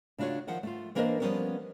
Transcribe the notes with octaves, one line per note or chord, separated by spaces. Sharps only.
C#3 A3 D4 F4 F#4 C#5
D#3 F3 F#5
A3 F4
E3 A#3 D4 A#4 C5 D#5
F3 G3 B3 C#4 F#4 A#4